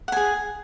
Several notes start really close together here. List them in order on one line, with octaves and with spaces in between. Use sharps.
F#5 G#5 G#4